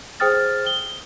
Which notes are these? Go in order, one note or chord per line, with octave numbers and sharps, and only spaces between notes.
G#4 C5 G5 D#6 F6 A6
G7